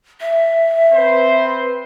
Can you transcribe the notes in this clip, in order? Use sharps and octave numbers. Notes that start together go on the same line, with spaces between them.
E5
C4 B4 C5